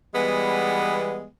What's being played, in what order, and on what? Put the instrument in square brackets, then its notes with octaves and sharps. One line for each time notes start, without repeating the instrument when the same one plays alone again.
[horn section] E3 G3 G#3 B3